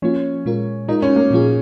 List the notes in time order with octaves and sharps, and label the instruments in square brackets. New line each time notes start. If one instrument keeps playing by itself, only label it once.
[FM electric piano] F3 A#3 F4 [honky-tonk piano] C#4
[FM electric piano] A#2 G#3 F4 A#4
[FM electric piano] G#3 F4 A#4 [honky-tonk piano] D#4
[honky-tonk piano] C#4
A#3
[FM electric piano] A#2 F3 C#4 F4 G#4